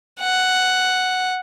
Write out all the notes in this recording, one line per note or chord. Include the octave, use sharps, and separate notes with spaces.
F#5